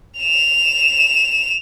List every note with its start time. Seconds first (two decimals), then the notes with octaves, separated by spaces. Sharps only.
0.19 E7 F7